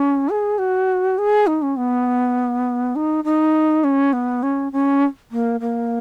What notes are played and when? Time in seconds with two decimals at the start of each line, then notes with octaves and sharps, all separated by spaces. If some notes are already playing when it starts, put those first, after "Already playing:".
Already playing: C#4
0.29 G#4
0.58 F#4
1.18 G#4
1.47 D#4
1.62 C#4
1.77 B3
2.96 D#4
3.24 D#4
3.84 C#4
4.13 B3
4.43 C#4
4.72 C#4
5.31 A#3
5.60 A#3